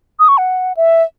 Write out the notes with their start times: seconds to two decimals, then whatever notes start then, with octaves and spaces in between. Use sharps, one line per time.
0.19 D#6
0.28 C#6
0.38 F#5
0.77 E5